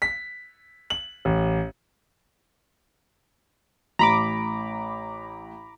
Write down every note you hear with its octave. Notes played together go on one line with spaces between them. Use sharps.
B6
F#7
A1
A1 A#5 B5 D6